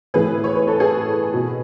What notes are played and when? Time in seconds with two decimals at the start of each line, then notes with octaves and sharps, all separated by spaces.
0.14 A2 E3 G#4 B4
0.44 C#5
0.55 B4
0.68 A4
0.79 G#4 B4
1.34 B2